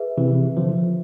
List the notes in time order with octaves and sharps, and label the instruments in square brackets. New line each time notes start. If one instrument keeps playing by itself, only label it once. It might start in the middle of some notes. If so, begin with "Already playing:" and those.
Already playing: [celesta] G#4 B4 E5
[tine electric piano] C3 E3
D3 F3